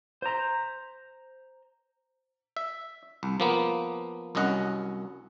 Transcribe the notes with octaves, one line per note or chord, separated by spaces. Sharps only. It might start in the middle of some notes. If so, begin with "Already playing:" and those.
C5 A#5
E5
C2
F3 A#3 B3
C2 F#2 C#4 D#5 F#5